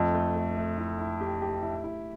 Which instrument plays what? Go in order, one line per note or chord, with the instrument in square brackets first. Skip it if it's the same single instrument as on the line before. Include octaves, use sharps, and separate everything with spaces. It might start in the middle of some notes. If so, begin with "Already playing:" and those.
Already playing: [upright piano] F2 [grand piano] A3
[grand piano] A3
A3
A3
E4
E4
G4
G4
E4
E4